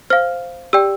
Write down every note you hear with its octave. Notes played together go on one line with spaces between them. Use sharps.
C5 F5 F6
G4 D5 G5 E6